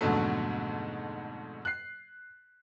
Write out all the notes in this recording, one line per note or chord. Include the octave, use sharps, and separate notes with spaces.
F2 G#2 B2 D3 F#3 A3
F#6 C7